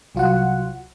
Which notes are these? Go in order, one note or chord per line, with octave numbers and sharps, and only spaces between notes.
C2 F#3 F4 F#4 F#5